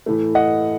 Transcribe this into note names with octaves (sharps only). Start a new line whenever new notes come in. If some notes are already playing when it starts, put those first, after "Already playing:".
A2 E3 A3
D#5 F#5